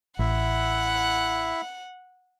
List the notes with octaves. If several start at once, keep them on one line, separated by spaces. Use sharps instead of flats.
A1 E4 E5 F#5